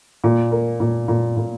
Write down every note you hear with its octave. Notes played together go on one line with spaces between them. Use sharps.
A#2
A#3
A#2
A#2
A#2